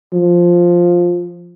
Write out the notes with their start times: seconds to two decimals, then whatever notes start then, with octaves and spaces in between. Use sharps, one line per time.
0.13 F3